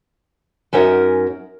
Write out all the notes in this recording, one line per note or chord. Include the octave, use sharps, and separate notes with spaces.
F#2 C#4 D#4 A#4 F#5